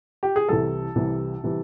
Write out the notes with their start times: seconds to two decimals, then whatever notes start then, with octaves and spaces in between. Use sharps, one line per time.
0.23 G4
0.36 G#4
0.49 C2 C3 E3 G3 A4
0.95 C2 C3 E3 G3
1.44 C3 E3 G3